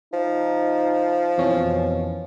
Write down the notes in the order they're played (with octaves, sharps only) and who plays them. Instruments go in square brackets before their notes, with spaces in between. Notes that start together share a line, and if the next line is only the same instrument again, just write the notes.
[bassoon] F3 [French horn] D#4
[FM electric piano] F2 E3 C#4 [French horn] B2